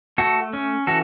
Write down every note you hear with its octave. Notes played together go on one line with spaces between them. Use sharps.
A3 F#4 A4
C#4
E3 F#4 A4